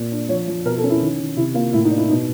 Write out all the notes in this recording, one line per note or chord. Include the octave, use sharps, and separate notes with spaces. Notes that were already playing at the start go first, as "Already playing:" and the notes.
Already playing: A#2
D4
F3 C#5
F3
B2 A#4
A4
C#4
E4
D#3
D#3
C3 E4
A#3 F4
A2 E4
D#4
D4
E4
B2 D#4